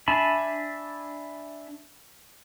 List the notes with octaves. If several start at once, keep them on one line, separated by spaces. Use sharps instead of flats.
D4 E5 G#5 A5 B5